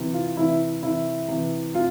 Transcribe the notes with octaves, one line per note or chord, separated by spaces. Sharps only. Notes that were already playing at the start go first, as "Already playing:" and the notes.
Already playing: C3 E3
F4
C3 E3 E4
C3 E3 E4
C3 E3
C3 F4